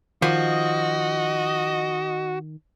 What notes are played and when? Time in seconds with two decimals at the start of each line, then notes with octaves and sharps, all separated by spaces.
0.22 D#3 F3 F#4 D#5